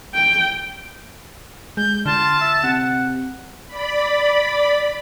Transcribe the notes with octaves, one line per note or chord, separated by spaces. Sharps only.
G5
G#3 G6
D3 F4 A5
E5
C3 F#5
D5 B5